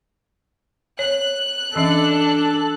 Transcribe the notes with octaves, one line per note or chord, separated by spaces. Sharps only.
C#5 F#6
E3 C#4 D4 A4 E5